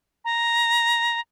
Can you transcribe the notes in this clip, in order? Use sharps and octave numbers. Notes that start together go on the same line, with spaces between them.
A#5